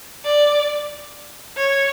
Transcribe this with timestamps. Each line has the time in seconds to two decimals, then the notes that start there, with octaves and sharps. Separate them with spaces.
0.24 D5
1.57 C#5